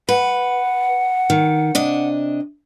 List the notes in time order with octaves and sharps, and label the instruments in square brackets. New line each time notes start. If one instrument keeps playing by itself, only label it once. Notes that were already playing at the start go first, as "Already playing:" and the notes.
[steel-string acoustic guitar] B4 [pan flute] F#5
[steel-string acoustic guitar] D#3
C3 D4 D#5